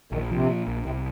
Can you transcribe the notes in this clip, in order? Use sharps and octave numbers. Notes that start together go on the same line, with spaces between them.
A#1 D#2 D#3
C3 F3
A#2
A#1
C2 C3